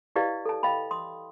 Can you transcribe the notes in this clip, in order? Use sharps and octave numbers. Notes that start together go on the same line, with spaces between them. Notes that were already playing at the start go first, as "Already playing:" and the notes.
E4 G4 B4 D5 D#5 F5
A4 A5
D#5 F5 G5 B5
C6 D#6